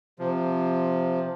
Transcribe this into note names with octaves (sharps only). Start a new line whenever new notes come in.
C3 F3